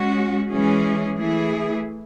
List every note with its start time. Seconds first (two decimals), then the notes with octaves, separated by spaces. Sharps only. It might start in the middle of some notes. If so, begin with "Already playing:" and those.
Already playing: G#3 C#4 F#4
0.49 E3 G#3 C#4 G#4
1.18 E3 A3 E4 G#4